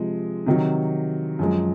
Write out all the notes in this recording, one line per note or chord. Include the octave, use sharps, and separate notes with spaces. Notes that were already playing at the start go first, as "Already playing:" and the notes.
Already playing: C3 F3 G#3
C3 D#3 F#3
F#2 F3 G#3